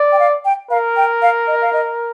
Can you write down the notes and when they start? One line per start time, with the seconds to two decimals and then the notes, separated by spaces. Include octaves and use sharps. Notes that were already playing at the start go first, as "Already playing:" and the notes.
Already playing: D5
0.12 G5
0.19 F5
0.45 G5
0.70 A#4 F5
0.97 G5
1.22 F5
1.47 D#5
1.62 F5
1.73 D#5